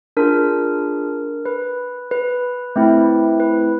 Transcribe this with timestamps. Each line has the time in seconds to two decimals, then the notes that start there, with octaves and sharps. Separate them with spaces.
0.17 D4 F4 G#4 A#4
1.46 B4
2.11 B4
2.76 A3 C4 E4
3.40 B4